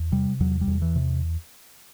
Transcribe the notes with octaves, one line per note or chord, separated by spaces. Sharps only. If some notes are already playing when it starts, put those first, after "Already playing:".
Already playing: E2
C3 G3
E2 F#3
G3
E2
E3
C3